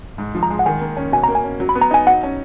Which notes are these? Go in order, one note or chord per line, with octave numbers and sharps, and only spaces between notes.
G#2
F3
A#5
G#3
F#5
D#3 G#5
A#3
C#4
B2 G#5
A#3 A#5
G#5
C#4
F#3
B5
B3
A#5
D#4 G#5
F#3 F#5
C#4